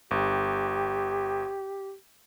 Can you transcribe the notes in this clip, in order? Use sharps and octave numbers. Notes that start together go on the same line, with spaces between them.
G1 G4